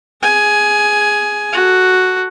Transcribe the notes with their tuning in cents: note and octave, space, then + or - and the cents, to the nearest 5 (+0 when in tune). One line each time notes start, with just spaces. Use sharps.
G#4 -5 G#5 +15
F#4 +0 A4 +5